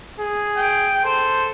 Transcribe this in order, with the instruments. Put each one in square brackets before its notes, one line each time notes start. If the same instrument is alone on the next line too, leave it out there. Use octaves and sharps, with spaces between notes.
[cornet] G#4
[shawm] G5
[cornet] A4 [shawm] C5